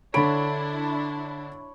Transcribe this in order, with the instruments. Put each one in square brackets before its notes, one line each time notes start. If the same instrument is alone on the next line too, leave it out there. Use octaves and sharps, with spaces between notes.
[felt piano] D3 D7 [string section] D4 E4 [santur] C#5 B5